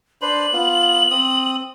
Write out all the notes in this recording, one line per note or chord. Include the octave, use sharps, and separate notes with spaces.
D4 B4 C5 F#7
B3 F4
C4 D#6